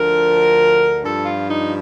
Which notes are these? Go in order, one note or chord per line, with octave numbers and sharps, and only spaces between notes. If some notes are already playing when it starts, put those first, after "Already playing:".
Already playing: D2 D3 F3 A#4
G2 F3 A4
F4
D#4